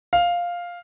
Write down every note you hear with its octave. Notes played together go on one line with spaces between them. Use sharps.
F5